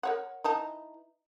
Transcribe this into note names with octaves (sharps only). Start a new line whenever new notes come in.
A#4 C#5 F#5
E3 D#4 A5